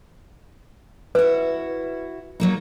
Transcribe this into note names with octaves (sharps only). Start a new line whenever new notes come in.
E4 F#4 B4
F#3 A#3 D#4